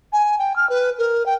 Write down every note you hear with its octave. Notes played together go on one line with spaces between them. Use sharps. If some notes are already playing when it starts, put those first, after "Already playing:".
G#5
G5
F6
B4
A#4
G5